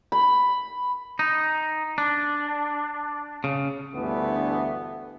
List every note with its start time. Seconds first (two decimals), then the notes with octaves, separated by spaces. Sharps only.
0.12 B5
1.19 D#4
1.98 D4
3.44 C#3
3.95 D2 G2 E3 A3 B3